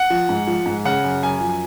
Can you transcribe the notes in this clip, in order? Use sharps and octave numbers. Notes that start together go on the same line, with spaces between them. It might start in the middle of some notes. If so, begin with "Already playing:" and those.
Already playing: F#5
F3
G#2
F3
G#2
C#3 F#5
F#2
F#2 G#5
F3
G#5